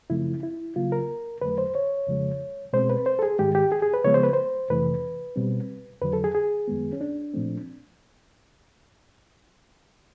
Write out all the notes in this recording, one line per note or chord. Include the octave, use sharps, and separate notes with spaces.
F#2 C#3 F3 A3 C4 E4
E4
C#3 F#3 A#3 F4
A#4
F2 D3 F#3 A3 B4
C5
C#5
F2 C#3 F3 G#3
B2 G#3 C4 C5
B4
C5
A4
G#4
G#2 D#3 G#3 G4
G4
G#4
G#4
B4
C#3 F3 G#3 B3 C#5
C5
B4
C5
F2 C3 E3 A3 B4
B2 G3 C4
F2 D3 F#3 B4
A4
G#4
G#4
F#2 D#3 G#3 B3
C#4
D4
A#2 F3 A3 C4